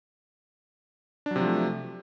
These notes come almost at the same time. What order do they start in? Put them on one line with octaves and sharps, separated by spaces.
D4 F#3 C3 F3 A3